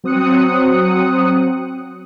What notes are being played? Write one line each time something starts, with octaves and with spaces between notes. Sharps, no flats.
F#3 C4 D#6 F#6 C#7